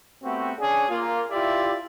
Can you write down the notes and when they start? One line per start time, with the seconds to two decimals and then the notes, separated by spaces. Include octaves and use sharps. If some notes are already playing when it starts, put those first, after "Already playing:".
0.23 A3 B3 C4 F#4 G4
0.58 C#4 D4 G#4
0.89 A#3 F4
1.31 E4 F4 G4 D5 E5